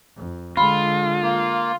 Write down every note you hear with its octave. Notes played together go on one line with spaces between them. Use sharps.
F2
D3 G#3 F4 B5
A#3